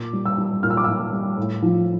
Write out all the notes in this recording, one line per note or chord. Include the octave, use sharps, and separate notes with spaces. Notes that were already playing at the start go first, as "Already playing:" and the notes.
Already playing: A#2 D6
G3
E6
G3
A#2 F6
E6
D6
A#2 E6
G3
A2
F3